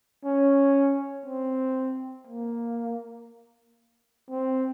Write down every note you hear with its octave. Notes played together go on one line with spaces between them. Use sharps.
C#4
C4
A#3
C4